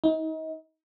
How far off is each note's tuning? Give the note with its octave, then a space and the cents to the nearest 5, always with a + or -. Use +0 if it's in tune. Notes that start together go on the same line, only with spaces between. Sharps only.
D#4 +35